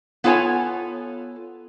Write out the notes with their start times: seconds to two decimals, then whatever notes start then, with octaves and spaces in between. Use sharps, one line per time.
0.24 B3 F4 A4 C#5 G#5